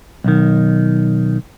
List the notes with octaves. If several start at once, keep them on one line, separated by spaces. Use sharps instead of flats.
B1 D#3